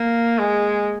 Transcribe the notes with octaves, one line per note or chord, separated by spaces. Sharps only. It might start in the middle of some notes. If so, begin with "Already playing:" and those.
Already playing: A#3
G#3